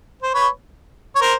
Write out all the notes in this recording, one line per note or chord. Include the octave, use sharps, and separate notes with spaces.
C5
B4 C#5
C#5
A#4 C5